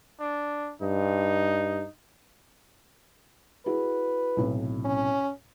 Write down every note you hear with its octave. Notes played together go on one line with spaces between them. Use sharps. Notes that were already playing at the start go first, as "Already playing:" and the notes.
D4
G2 D#4
E4 F#4 G#4 B4
B1 A2 C3
C#4